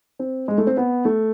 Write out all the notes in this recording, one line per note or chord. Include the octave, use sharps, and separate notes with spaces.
C4
G#3
A3
C4
B3
A3